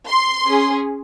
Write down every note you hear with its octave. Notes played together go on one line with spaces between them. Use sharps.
C6
C#4 G#4